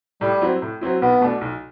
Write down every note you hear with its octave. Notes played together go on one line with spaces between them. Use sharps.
A2 G3
F#3 C4 E4
A2
F#3 C4 E4
B1 B3
B2 A3 D4
B1